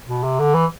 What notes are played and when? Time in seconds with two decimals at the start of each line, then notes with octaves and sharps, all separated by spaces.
0.08 B2
0.23 C3
0.39 D3
0.54 E3